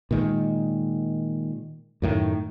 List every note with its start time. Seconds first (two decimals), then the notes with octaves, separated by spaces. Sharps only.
0.11 A#2 D#3 G#3
2.02 F#2 A2 D#3